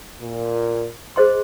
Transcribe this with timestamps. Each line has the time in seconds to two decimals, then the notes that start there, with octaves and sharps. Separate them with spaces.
0.21 A#2
1.16 G#4 C5 D#5 C6